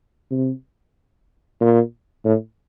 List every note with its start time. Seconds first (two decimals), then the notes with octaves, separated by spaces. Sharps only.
0.31 C3
1.61 A#2
2.25 A2